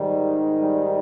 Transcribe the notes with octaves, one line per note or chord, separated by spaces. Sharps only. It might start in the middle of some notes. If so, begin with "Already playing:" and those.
Already playing: G#2 D#3 G3
G3